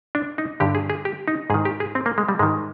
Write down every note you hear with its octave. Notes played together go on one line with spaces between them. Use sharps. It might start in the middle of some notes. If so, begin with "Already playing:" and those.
D4
D#4
G2 D3 G4
G#4
G#4
G4
D#4
G#2 D#3 G#4
G4
G#4
C4
A#3
G#3
G3
G#2 D#3 G#3